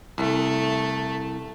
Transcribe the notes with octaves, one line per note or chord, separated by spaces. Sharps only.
C2 A3